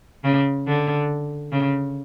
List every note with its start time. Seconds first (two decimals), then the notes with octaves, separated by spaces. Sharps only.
0.24 C#3
0.67 D3
1.52 C#3